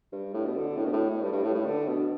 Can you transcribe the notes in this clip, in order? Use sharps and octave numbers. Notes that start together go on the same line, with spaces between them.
G2
A2
B2
D3
A2
B2
A2
A2
G2
G2
A2
A2
D3
B2